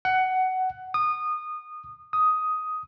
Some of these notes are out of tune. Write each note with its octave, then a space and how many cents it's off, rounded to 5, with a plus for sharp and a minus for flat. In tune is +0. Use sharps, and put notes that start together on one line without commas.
F#5 +15
D#6 -20
D#6 +10